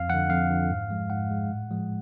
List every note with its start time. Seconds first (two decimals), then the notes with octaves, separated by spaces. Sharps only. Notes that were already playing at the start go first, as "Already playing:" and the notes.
Already playing: F2 F5
0.09 D3 F3 F#5
0.30 F2 F5
0.49 D3 F3
0.69 G#2
0.90 F3 G#3
1.10 G#2 F#5
1.30 F3 G#3
1.50 A2
1.71 F3 G#3